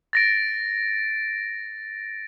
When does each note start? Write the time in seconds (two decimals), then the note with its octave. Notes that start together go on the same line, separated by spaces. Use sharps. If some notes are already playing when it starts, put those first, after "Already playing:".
0.13 A6 A#6 D7